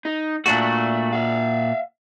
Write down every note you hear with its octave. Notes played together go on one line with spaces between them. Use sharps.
D#4
A#2 A3 D4 F#4
E5 F5